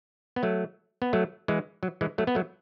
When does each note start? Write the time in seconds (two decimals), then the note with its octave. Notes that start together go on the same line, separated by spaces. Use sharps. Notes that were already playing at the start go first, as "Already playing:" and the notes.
0.36 B3
0.43 F#3 A3
1.02 B3
1.13 F#3 A3
1.48 E3 G#3
1.83 F#3
2.01 E3 G#3
2.18 F#3 A3
2.27 B3
2.35 F#3 A3